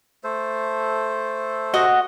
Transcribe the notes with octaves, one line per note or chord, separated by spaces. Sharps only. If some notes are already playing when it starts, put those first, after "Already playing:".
A3 A4 C5
F#4 D#5 F#5